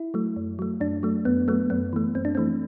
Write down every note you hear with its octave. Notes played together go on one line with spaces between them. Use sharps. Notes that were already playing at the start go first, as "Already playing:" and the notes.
Already playing: E4
F#3 A3
F#2
F#3 A3
F#2 D4
F#3 A3
F#2 B3
F#3 A3 B3
F#2 B3
E3 A3
F#2 C4
D4
E3 A3 C4